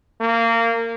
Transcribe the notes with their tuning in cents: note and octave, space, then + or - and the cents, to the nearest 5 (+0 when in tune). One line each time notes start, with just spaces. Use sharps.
A#3 -20